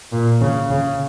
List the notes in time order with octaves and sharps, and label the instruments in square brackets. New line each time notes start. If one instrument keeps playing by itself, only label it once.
[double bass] A#2
C#3
C#3